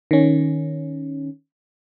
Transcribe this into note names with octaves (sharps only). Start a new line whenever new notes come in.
D#3 C#4